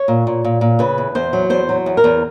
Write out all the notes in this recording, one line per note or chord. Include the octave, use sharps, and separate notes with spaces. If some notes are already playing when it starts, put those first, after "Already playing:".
Already playing: C#5
A#2
A#2
A#2
A#2
C#3 B4
E2
E2 C5
F#3
E2 C5
F#3
E2
A#4
E2